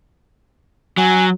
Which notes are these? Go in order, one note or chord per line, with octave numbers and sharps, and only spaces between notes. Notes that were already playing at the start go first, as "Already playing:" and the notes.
F#3 G#5